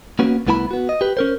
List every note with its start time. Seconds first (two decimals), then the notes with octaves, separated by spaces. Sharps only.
0.19 A#3 B3 C#4 F#4
0.47 C2 A3 B3 E4 G#5 B5
0.71 B3 F#4
0.89 D#5
1.01 G4 B4
1.17 C#4 A#4 C5